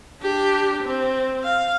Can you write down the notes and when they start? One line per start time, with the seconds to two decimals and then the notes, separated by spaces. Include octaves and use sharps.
0.22 D4 G4
0.83 C4
1.44 F5